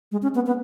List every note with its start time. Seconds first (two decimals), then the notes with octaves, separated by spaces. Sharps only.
0.12 G#3
0.22 C#4
0.35 B3
0.46 B3